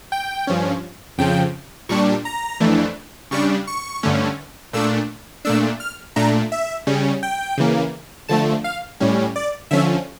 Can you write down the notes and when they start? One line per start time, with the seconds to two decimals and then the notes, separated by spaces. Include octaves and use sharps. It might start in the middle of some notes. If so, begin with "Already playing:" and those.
0.12 G5
0.47 G2 F3 C#4
1.18 F2 C#3 F3 G5
1.89 A#2 G3 D4 C#6
2.25 A#5
2.60 F2 E3 A3 D4
3.31 C#3 G3 D4 C#6
3.67 C#6
4.03 G2 D3 A3 C#4
4.73 A#2 A3 D4 E6
5.45 A#2 A3 D4 E6
5.80 F6
6.16 A#2 A3 D4 A#5
6.52 E5
6.87 C#3 G3 C#4
7.23 G5
7.58 C#3 E3 A#3
8.28 D3 F3 A3 A5
8.64 F5
9.00 A2 G3 C#4
9.36 D5
9.71 D3 F3 C#4 E5